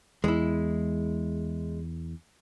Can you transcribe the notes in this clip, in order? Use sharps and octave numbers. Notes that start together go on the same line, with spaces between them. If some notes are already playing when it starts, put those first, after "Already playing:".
E2 G#3 E4